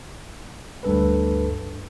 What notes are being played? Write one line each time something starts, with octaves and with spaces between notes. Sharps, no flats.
D2 G2 A4 B4